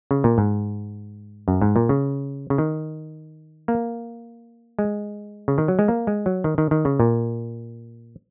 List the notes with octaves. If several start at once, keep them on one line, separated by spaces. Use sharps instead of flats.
C#3
A#2
G#2
F#2
G#2
A#2
C#3
C#3
D#3
A#3
G#3
C#3
D#3
F#3
G#3
A#3
G#3
F#3
D#3
D#3
D#3
C#3
A#2